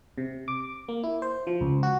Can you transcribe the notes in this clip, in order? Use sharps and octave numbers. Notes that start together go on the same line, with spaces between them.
C3
D6
A#3
E4
C5
F3
C#2
F#4